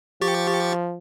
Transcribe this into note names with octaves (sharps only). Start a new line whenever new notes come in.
F3 G4 C#6 A6